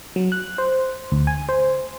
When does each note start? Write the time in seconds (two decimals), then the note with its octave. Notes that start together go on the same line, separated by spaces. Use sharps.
0.16 F#3
0.32 F#6
0.58 C5
1.12 D2
1.27 G#5
1.49 C5